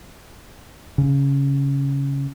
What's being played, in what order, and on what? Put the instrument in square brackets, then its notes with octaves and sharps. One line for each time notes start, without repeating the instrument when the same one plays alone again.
[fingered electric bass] C#3